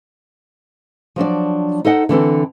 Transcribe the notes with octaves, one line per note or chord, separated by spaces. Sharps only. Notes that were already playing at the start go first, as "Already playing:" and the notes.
F3 F#3 D4 D5
D#4 A4 C5 D#5 F#5
D3 E3 C4 A4